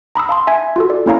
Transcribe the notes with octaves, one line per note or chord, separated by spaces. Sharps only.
A#5 B5 D#6 E6
F5 A5 C6
E5 G#5 G#6
F4 F#4 A4
D5
A#3 C#4 E4 C#5 F5 A#5